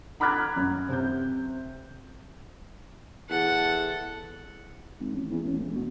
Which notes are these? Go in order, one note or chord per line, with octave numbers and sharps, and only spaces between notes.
A#5 B5 D6 F6 F#6 G#6
F#2
C3 G6
E2 A4 F#5
G#1
A1
E2
A1
E1
B2